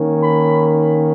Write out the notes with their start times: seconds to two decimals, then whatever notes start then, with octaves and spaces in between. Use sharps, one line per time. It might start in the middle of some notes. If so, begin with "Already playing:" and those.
Already playing: D#3 A#3 C#4
0.23 B5